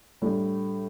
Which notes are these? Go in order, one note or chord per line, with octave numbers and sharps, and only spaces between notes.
A2 G3 D4